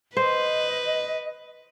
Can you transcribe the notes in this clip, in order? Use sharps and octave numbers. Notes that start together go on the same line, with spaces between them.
B4 C5 D#5